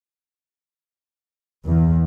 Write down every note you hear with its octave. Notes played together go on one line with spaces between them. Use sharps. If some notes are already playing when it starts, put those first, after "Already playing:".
E2